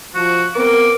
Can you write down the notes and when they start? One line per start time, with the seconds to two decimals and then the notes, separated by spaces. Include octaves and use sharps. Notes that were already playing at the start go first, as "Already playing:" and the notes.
0.15 F3 F#4
0.55 B3 C4 A#4 D6